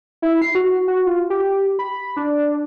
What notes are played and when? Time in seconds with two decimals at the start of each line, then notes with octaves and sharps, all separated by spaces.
0.22 E4
0.42 C7
0.55 F#4
0.88 F#4
1.06 F4
1.30 G4
1.79 B5
2.17 D4